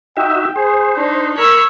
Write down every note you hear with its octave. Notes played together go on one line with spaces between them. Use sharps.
D#4 F#4 E5 G5
G#4 C5
D4 D#4
A#4 C#5 B5 E6